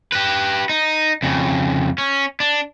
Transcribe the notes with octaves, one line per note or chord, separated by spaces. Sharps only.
G4 B4
D#4
F2 C#3
C#4
D4